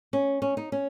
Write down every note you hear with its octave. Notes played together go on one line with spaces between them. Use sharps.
C#4
C#4
D#4
C#4